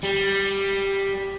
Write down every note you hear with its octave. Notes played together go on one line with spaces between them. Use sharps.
G3